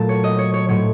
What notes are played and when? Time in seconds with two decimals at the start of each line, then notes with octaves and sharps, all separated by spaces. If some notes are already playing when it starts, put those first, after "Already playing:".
Already playing: A#2 F#3 A3 A5
0.09 C#5
0.24 D#5
0.39 C#5
0.54 C#5
0.68 A2 F#3 C4 C#5